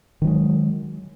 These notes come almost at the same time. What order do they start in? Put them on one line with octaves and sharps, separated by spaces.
D#3 F#3 G#3